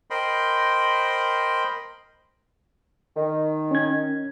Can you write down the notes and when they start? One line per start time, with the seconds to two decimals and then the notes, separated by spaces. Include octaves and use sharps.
0.10 A#4 C5 D#5 G5 B5 C6
3.17 D#3
3.71 C#4 G#6